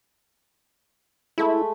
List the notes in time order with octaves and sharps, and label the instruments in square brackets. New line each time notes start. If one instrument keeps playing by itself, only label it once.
[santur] G#3 A3 B5 [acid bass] E4